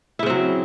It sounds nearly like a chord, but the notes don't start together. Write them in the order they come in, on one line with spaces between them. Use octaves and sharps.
E4 C#3 C4 F#3